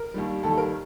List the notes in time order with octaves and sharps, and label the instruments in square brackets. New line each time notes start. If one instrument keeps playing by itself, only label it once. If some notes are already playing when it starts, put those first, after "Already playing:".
Already playing: [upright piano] A#4
D#2 D#3 G3
D#2 D#3 G3 A4
A#4